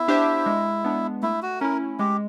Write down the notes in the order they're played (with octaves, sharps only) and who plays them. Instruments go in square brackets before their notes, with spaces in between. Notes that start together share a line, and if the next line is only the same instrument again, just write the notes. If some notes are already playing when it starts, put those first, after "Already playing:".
Already playing: [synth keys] B3 [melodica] E4
[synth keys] D4 G4 C5 E5
G#3
B3 D4
[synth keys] A3 [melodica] E4
[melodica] F#4
[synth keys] C#4 E4 [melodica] A#4
[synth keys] G#3 [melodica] G4